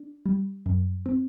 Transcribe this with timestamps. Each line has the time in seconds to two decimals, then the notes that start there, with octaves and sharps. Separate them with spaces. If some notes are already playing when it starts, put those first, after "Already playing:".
Already playing: D4
0.26 G3
0.66 F#2
1.06 C4